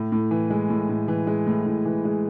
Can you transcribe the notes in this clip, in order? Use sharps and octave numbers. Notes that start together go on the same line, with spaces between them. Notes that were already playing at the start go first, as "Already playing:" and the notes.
Already playing: A2
A2
E3
G#3
A2
A2
E3
G#3
A2
A2
E3
G#3